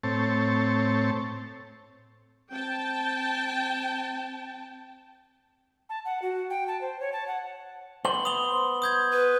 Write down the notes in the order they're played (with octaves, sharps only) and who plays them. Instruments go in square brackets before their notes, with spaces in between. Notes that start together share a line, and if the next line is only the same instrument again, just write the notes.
[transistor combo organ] A2 C4 C#5 A5
[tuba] C4 [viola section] G5 A5
[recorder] A5
F#5
F#4
G5
A5
C5
C#5
A5
F#5
[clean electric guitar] B3 C5 [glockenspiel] F#7
[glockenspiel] D#6 F7 G7
D#6 G6 G#6
[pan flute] B4